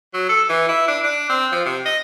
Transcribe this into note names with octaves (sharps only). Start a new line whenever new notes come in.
F#3
A4
E3
E4
D4
D4
C4
F3
C3
D#5